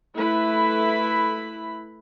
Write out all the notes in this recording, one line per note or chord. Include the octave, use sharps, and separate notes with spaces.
A3 E4 B4 B5